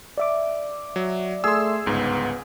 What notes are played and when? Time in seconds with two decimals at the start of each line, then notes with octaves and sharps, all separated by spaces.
0.18 D5 E5 D6
0.96 F#3
1.44 A3 G#4 C6 E6
1.86 G1 C#2 G#2 B3